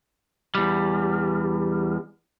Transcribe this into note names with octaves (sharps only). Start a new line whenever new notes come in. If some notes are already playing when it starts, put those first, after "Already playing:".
E2 G3